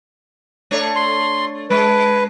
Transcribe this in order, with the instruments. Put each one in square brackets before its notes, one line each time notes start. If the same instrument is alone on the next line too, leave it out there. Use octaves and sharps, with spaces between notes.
[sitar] A3 D4 C#5
[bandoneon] C6
[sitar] G#3 [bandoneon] B4